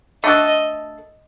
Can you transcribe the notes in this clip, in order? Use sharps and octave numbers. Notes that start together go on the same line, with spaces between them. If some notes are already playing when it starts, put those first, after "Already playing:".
A3 D4 F#4 A4 D#5